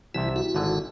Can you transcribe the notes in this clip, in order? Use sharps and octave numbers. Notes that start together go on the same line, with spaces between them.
C2 C3 E3 E4
E4 F#4
G#1 D3 G#5